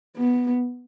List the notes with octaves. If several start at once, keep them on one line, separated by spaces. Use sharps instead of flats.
B3